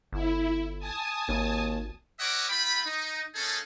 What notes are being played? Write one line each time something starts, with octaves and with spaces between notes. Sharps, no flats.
G1 E4
G#5 A5 D#6
G#1 D#2
A#4 C#5 D#5 E5 F#5 D6
C4 F4 G5 B5
D#4
A#3 C#4 D#4 G#4 A4